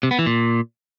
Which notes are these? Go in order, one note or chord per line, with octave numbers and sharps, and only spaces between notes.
C3
B3
E3
A#2